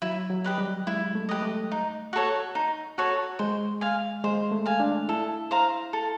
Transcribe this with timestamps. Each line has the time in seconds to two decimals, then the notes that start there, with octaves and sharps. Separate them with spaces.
0.02 F#3 E4
0.30 F#3
0.44 G4 B4 D#5
0.58 G3
0.87 G#3 E4
1.15 A3
1.29 G4 B4 D#5
1.43 A3
1.72 D#4
2.13 F#4 A4 C#5
2.55 D#4
2.98 F#4 A4 C#5
3.39 G#3 C5
3.81 F5 G#5
4.24 G#3 C5
4.52 A3
4.66 F5 G#5
4.80 D4
5.09 E4 A4
5.51 C5 F5 A#5
5.93 A4